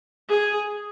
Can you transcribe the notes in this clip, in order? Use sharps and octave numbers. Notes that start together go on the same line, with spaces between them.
G#4